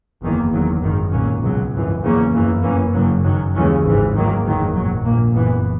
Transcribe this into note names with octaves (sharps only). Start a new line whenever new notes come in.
F#1 E2 D#3 A#3
F#1 E2 D#3 F#3
G#1 F#2 D#3
B1 A#2 F#3 A#3 C#4
C#2 B2 F#3
G#1 F#2 E3
E2 C#3 F#3 A#3 C#4
F#1 F#2 E3 A#3
F#2 E3 A#3 C#4
F#1 F#2 C#3 F#3
F#2 D#3 F#3
D#2 C#3 E3 G#3 C#4
G#1 G#2 E3
G#2 D#3 F#3 A#3
F#1 E2 D#3 F#3
A#1 G#2 F#3
A#1 A#2 A#3
F#1 F#2 E3 B3